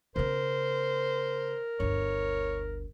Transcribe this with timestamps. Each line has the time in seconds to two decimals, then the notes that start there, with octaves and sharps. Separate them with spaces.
0.16 C#3 B3 A#4 C5
1.80 G1 D2 C#5